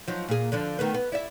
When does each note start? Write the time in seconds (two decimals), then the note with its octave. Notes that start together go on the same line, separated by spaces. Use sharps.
0.08 F3 F#3 D#4
0.29 A#2 G#4
0.52 D3 F3 D4
0.79 D#3 A3 B3
0.94 B3
1.12 E4 D5 E5